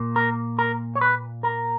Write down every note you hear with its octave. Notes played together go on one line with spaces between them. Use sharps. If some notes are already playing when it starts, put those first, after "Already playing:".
Already playing: A#2 A#3
A#4
A#4
C#5
B4
A#4